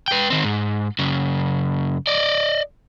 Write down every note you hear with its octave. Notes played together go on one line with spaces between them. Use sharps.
B4 G5
D#3 C4
G#2
F#2 C#3
D5 D#5